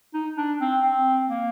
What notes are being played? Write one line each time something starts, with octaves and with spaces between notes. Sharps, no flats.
D#4
D4
C4
C4
A#3